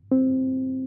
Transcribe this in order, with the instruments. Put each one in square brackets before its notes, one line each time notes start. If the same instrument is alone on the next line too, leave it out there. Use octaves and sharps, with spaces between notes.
[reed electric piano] C4